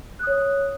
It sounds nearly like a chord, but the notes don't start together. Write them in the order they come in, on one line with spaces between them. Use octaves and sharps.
F#6 D#6 C#5